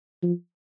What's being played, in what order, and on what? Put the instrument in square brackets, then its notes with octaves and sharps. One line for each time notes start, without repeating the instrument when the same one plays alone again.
[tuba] F3